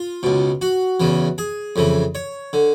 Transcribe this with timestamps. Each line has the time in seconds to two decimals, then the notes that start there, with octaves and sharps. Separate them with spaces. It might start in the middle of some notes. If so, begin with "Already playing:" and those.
Already playing: F4
0.23 C#2 B2
0.62 F#4
1.00 E2 C#3 E3
1.38 G#4
1.76 F2 C#3 E3
2.15 C#5
2.53 D3